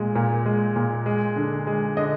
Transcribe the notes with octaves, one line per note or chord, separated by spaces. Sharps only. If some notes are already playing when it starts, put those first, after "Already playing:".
Already playing: A#2 G#3
A#2
G#3
A#2
G#3
D3
G#3
D3 D#5